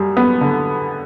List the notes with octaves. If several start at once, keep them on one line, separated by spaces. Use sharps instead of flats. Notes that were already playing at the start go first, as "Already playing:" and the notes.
Already playing: F#2 G3
B3
D3